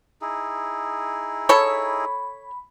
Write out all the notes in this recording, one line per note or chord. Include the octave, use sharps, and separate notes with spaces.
D#4 E4 G#4
A4 C#5 B5